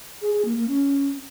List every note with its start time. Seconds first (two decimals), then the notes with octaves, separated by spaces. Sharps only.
0.22 G#4
0.33 G#4
0.45 A#3
0.56 A#3
0.68 C#4